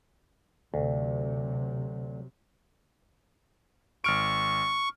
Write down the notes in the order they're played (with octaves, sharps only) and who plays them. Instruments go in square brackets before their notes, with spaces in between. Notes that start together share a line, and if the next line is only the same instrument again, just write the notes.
[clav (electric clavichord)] D2 [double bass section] C3 F#3
[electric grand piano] G#1 F6 D7 [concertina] C#6